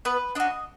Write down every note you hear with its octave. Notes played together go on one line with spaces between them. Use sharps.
B3 B4
D4 F#4 D#5